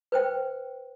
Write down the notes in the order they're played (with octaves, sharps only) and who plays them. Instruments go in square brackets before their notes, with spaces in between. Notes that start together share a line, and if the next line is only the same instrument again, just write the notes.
[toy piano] B4 C5 G5